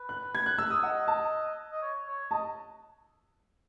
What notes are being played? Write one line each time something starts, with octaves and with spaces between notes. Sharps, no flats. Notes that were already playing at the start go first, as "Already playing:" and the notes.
Already playing: B4
F#6
G#6
F#6
E6
D#6
D#5 F#5
A5
D#5
C#5
C#5
D#5 A5